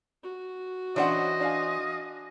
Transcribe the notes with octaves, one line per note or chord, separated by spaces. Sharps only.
F#4
E3 C#4 D4 C5 C#5 D#5 F#5
D4 F5 G#5